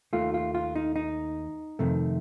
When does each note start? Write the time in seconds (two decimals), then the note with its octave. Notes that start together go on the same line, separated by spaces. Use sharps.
0.13 D#2 D#3 A3 F4
0.34 F4
0.55 F4
0.75 D#4
0.96 D#4
1.79 F2 C3 D#3 A3